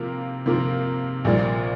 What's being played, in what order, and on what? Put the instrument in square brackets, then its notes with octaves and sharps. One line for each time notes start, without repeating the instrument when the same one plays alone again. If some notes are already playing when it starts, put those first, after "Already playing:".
Already playing: [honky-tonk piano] C3 F3 A#3 F4 A#4
C3 F3 A#3 F4 A#4
A#1 A#2 G3 A#3 F4